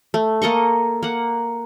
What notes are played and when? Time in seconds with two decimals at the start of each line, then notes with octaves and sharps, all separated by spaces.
0.14 A3
0.42 A#3 A4 D#5 C#6
1.03 A#3 F#5